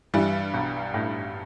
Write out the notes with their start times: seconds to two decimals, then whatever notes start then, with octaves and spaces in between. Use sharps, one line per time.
0.14 G2 E3 G3
0.54 B1
0.94 A2